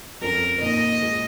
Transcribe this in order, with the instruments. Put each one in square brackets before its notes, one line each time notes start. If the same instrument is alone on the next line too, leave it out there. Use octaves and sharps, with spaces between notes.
[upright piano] F2 F3 C#4 [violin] A#4
[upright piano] A#2 A#3 D#4 [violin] D#5
[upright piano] A#2 G#3 F4